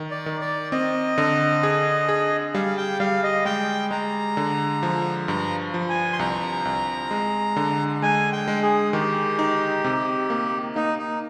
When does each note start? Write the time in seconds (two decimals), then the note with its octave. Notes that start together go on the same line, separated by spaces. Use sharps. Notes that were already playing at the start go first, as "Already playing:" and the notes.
Already playing: D#3
0.11 D5
0.26 D#3
0.41 D5
0.72 C4 D#5
1.18 D3
1.63 G#4
2.09 G#4
2.54 G3 F5
2.77 G5
3.00 G3 F5
3.23 D#5
3.45 G#3 G5
3.91 G#3 A#5
4.37 D3
4.83 F3
5.28 G2 A#5
5.74 F3
5.89 G#5
6.13 C6
6.19 C2 A#5
6.65 C2
7.11 G#3
7.56 D3
8.02 G#3 G#5
8.33 G5
8.48 G#3
8.63 G#4
8.93 D#3 G4
9.39 D#4
9.84 C3
10.30 A#3
10.75 A#3 D#4
10.98 D#4